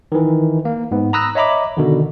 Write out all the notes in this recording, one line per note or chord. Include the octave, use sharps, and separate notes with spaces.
D#3 E3
A#3
G#2 B3
A#5 B5 D#6 E6 F#6 A#6
C#5 D#5 E5 A#5 B5 D6
B2 D3 D#3